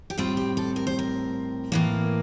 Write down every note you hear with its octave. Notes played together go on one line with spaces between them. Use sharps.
G4
A2 G3 C4 F4
G4
A4
A#4
C5
A#4
A2 E3 A#3